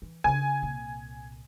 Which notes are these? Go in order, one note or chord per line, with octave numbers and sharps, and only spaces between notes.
E3
C#3 D4 G#5
C2 A#2